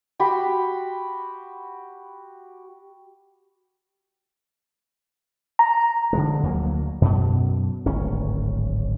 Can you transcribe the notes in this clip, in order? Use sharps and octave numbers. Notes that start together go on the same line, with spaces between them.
F#4 G4 B5 C6
A#5
D3 F3 G#3
D2 F#3 A#3
F#2 B2
D1 G#1 C#4